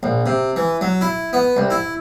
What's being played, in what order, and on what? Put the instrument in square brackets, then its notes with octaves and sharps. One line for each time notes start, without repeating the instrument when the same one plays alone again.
[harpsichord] A#1
C3
E3
F#3
E4
B3
C2
E4